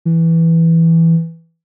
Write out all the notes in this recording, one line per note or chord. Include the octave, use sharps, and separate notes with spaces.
E3